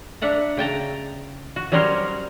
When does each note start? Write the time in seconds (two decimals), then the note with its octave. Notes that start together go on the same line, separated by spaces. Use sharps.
0.22 D4 E5 F#5 A#5
0.57 C#3 G5 A5 A#5
1.56 F#4
1.72 F#3 G3 C#4 A#4 C5 C#5